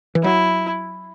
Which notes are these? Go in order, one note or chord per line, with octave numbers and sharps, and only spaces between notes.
E3
F#3 E4